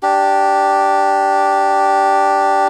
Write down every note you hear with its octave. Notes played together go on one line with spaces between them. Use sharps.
D4 G4